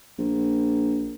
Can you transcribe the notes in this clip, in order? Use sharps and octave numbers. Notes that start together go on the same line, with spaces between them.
A#1